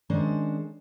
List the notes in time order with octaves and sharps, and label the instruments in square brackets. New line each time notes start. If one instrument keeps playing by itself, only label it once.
[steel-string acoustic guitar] D#3 G#3 C#4 D4 C5